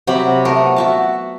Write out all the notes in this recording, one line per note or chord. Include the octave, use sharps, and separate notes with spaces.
C3 F#3 G4 B5
A3 B3 A4 A#4
F#4 E5 A5